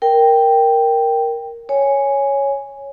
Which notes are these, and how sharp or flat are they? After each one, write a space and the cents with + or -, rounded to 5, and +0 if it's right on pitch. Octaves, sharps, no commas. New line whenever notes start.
A#4 +0 G5 +0
C#5 +0 G#5 -5